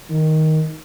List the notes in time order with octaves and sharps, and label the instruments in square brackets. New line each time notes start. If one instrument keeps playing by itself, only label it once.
[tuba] D#3